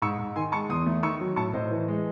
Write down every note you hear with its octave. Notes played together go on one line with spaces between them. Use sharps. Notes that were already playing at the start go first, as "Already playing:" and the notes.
G#2 C#6 E6
G#2
D#3 G#5 C6
G#3 A5 C#6
E2 C6 D#6
A3
D#3 C#6 E6
F#3
A2 A5 C#6
A2 C5 D#5
E3
G#3